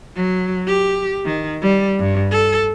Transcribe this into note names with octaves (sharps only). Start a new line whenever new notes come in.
F#3
G4
D#3
G3
G2
A4